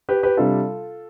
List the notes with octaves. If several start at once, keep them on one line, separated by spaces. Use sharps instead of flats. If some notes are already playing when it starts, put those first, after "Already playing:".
G4 B4
G4 B4
C3 G3 D4 F4 A4